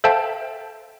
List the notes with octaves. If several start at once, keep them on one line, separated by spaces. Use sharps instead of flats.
A4 C5 E5 F5 G5 A5